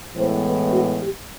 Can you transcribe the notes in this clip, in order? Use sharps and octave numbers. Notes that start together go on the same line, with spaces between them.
A2 E3 G#3 B3 C5
B4
F#4
G4